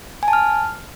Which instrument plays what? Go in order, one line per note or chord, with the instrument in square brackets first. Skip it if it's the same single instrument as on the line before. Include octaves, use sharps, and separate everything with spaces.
[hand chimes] G#5
A5
F6